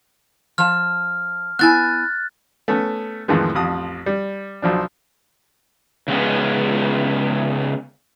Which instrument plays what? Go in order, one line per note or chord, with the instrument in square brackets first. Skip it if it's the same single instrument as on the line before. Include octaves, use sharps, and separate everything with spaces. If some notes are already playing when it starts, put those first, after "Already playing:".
[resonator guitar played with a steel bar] F3 A5 [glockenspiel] F6
[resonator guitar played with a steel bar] B3 E4 G#5 [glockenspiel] F#6 A6
[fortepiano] A3 B3 C#4
F2 A2 D#3 E3 G#3
A1 F2 D#6
G3
B1 F3 D4
[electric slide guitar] C#3 G#3 B3 C#4